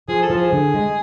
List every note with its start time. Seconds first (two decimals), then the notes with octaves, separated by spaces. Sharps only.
0.08 F3 G#4
0.23 A4
0.30 F3
0.37 G#4
0.53 D3
0.74 G#3